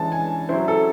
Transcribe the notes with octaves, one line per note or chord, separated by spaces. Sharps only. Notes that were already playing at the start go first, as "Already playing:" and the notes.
Already playing: E3 G#3 C#4 A5
G#5
F#3 C#4 E4 C5
A4